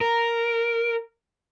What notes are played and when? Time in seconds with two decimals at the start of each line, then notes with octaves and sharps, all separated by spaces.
0.01 A#4